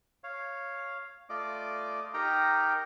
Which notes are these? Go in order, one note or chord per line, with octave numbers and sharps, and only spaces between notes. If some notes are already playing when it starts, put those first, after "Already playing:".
C#5 F5
A3 F4 D5 D#5 D6
D#4 G4 A#4 G5 A#5